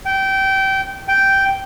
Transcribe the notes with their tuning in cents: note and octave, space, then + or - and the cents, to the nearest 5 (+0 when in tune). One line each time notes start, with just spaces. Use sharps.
G5 -20
G5 -5